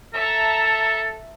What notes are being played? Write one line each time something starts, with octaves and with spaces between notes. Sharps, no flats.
A4 E5 A5 A#5